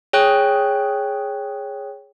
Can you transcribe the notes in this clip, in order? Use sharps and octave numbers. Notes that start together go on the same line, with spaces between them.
G#4 C#5 G5 F#6